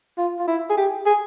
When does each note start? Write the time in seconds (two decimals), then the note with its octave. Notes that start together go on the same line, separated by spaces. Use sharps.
0.18 F4
0.39 F4
0.47 E4
0.70 G#4
0.77 G4
1.06 G#4